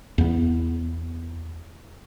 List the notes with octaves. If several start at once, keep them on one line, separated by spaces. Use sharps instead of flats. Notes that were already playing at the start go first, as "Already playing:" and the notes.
E2 B3